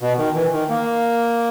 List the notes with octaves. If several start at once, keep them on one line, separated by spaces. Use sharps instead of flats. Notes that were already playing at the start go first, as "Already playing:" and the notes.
B2
D#3
E3
D#3
A#3